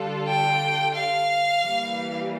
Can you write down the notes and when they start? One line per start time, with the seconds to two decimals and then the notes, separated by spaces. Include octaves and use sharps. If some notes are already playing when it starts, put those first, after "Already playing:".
Already playing: D3 G3 D4 F4 A4
0.28 G5
0.95 F5
1.61 E3 G3 A#3